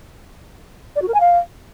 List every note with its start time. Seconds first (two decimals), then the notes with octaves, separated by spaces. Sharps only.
0.96 D5
1.02 F#4
1.08 A#4
1.14 G#5
1.20 F5